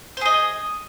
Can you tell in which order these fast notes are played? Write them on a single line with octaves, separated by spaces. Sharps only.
C5 G#4 D#5